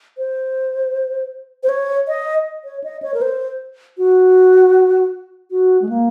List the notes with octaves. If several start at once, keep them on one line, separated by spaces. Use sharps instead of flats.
C5
C5
C#5
D#5
C#5
D#5
C#5
A#4
C5
F#4
F#4
G#3
A#3